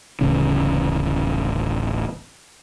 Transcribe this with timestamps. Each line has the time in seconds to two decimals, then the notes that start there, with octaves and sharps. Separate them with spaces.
0.21 D1 A1 C#3 C#4